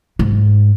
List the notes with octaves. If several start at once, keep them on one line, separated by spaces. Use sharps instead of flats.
G#2